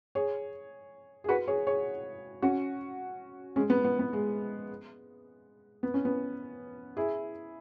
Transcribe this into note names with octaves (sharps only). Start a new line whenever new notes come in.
G#4 C#5
G#4
F#4 B4
G#4 C#5
G#4 C#5
C#4 F#4
G#3 C#4
B3
B3
B3
G#3
B3
C#4
B3
E4 G#4